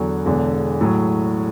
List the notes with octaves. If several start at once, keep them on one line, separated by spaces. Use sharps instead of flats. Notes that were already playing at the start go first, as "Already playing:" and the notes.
Already playing: E2 D3 F#3
E1 E2 D3
A2 F#3